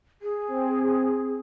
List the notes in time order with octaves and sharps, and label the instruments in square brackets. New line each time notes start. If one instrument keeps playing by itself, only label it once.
[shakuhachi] G#4
[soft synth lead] C4